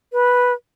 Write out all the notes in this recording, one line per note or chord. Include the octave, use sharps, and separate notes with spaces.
B4